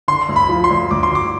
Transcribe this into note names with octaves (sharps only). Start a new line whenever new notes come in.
D3 C6
D2
B5
F3
C6
D2
D2 D6
C6
D2 D6